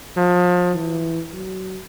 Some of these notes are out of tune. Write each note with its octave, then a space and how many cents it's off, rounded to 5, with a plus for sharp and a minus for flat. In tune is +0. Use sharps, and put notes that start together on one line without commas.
F3 +30
E3 +0
F#3 +25